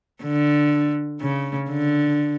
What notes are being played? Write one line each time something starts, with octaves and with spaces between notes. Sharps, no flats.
D3
C#3
D3